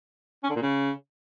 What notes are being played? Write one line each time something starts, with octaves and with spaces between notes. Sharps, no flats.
C#4
D3
A#2
C#3